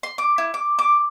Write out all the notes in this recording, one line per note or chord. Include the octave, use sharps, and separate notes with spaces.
C6
D6
E4
D6
D6